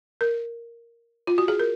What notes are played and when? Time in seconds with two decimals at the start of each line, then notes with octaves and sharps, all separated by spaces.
0.21 A#4
1.27 F4
1.38 F#4
1.48 G#4
1.59 A#4